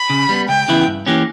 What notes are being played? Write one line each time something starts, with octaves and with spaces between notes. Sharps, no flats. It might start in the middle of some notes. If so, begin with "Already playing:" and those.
Already playing: B5
C#3
G3 B3
C#2 G5
C#3 E3 B3 E4
G2
E3 A#3 C#4 G4